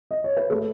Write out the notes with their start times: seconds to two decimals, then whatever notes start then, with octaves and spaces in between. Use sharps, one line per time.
0.11 D#5
0.24 C#5
0.37 B4
0.50 A3 A4